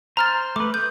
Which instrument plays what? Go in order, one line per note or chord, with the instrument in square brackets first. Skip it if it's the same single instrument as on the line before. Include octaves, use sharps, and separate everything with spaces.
[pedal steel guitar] C5 [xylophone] A#5 F6 A6
[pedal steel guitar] A3 B4 [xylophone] D6
[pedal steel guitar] D#6 [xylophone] G6